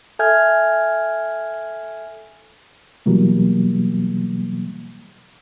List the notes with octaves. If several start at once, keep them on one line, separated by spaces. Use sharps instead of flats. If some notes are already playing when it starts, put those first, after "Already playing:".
A4 E5 G#5 F6 G6 G#6
B2 E3 F#3 G3 A#3